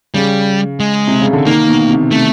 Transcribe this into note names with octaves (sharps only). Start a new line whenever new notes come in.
C#3 G3
G#3
C3
C#3
D3
D#3 A#3
B2
C3
C3 A3